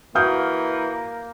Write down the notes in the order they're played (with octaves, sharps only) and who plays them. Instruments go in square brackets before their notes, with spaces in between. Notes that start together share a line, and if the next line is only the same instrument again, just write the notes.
[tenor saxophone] E3 [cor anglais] A#3 [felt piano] F#4 G6 [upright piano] F5 D#6 F6